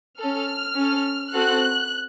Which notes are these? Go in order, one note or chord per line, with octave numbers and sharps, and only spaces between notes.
C#4 A4 F6
C#4 A4
C4 F#4 A4 F#6